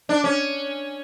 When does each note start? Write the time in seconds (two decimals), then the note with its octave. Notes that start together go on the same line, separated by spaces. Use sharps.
0.09 D4
0.24 C#4